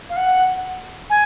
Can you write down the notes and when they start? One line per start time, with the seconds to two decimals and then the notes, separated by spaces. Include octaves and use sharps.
0.09 F5
0.16 F#5
1.10 G#5